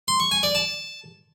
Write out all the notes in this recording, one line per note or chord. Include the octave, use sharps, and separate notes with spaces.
C6
C#6
G#5
D5
A5